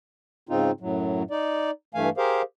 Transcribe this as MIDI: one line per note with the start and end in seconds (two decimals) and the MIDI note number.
0.49 0.71 44
0.49 0.71 49
0.49 0.71 60
0.49 0.71 63
0.49 0.71 65
0.80 1.23 42
0.80 1.23 45
0.80 1.23 54
1.30 1.71 63
1.30 1.71 74
1.94 2.09 43
1.94 2.09 52
1.94 2.09 57
1.94 2.09 77
1.94 2.09 80
2.17 2.42 67
2.17 2.42 68
2.17 2.42 70
2.17 2.42 72
2.17 2.42 77